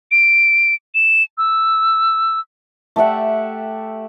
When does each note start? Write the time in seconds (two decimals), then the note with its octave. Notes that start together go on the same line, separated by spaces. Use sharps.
0.12 D7
0.95 E7
1.38 E6
2.96 A3 G4 E5 F#5